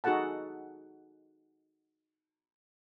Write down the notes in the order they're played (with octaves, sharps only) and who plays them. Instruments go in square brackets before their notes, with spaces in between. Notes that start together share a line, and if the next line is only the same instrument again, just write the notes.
[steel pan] D#4 F#4 G#4 A4 F#5 A5